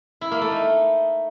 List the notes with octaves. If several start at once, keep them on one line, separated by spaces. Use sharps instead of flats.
E4
A#3
A3
D#4